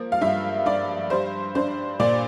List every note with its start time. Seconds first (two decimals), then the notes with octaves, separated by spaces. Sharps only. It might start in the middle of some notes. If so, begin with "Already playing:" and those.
Already playing: F3 A#3
0.12 F5
0.21 G2 E5
0.66 G2 D5
1.10 G3 C5
1.55 D4 C5
2.00 A#2 D5